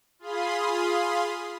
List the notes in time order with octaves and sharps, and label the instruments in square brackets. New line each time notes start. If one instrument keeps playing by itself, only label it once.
[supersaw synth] F4 G#4 F5 B5 C6 D#6